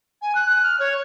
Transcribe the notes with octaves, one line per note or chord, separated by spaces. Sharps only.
G#5
F#6
F#6
F6
C#5